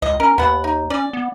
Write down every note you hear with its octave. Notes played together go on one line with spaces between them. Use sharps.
C#2 D#5
C#4 A#4
D#2 B3 F#5
D#4
C#4 D5
B3